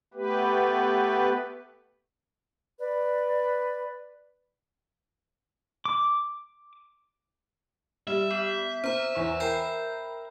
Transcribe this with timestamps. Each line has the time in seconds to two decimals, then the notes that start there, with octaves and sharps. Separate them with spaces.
0.14 A3 B3 G4 B4
2.80 B4 D5
5.85 D6
8.07 G3 E5
8.31 B3
8.84 C4 C5 A#5
9.15 E2 C#5
9.40 A#4 G5 B5 G6